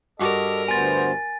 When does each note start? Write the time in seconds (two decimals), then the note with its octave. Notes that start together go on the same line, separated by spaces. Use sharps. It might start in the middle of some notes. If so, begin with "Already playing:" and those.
0.20 G2 F#4 A4 A#4 D5 D#5
0.68 D2 B3 C5 G#5 A6